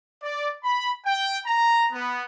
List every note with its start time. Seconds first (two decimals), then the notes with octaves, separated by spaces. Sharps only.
0.21 D5
0.62 B5
1.04 G5
1.45 A#5
1.90 B3